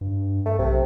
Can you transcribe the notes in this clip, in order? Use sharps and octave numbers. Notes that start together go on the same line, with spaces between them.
G2
A3
B1 C3